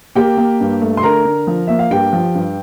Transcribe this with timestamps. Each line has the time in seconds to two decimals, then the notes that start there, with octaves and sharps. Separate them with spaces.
0.15 A#3 G4 G5
0.37 A#3
0.60 G2
0.81 A3
0.97 C6
1.03 D3 A#4 A#5
1.25 D3
1.47 F3
1.67 A#3 E5
1.79 F5
1.91 G2 G4 G5
2.13 F3
2.35 G2